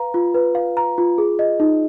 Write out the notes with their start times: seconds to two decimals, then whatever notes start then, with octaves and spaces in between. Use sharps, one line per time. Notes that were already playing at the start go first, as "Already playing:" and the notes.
Already playing: B4 F5 A#5
0.14 F4
0.34 B4
0.55 F5
0.77 A#5
0.98 F4
1.18 G#4
1.39 D#5
1.60 D#4